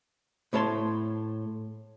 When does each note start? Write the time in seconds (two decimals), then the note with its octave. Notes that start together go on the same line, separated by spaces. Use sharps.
0.53 A2 A3 B3 C#5 A5 C6